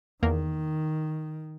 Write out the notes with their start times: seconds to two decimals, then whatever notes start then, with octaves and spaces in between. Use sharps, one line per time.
0.23 E2 D#3 A#3